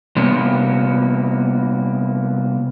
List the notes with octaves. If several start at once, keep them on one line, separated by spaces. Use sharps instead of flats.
C3 G3 A#3 B3